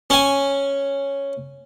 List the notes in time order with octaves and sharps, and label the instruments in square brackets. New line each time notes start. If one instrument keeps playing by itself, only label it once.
[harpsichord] C#4 G#5